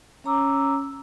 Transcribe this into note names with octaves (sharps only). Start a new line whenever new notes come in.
C#4 C#5 A#5 D6 E6